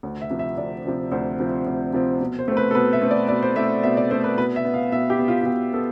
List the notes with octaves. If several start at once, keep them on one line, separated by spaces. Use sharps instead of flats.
D2
E5
C3 F3 C4
E5
D2 D5
C3 F3 C4
D2 C5
C3 F3 C4
D2
C3 F3 C4
B2
C5
A3 C4
B4
A4
B2 B4
E5
A3 C4
D5
B2 D5
C5
A3 C4 E5
B2 E5
D5
A3 C4 C5
B4
B2 B4
E5
B3
F5
B2 E5
G4
B3
F4
F4
B2 G4
B3 A4